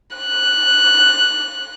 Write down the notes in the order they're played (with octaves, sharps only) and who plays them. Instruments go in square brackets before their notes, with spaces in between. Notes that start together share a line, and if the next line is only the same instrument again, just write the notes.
[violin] F#6